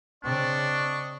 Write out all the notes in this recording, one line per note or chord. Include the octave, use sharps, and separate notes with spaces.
C#3 C4 D4 D5 D#5 C#6